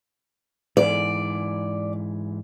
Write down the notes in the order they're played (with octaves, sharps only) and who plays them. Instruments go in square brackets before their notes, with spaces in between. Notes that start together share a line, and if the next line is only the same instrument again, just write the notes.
[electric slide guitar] G#2 E3 [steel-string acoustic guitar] D5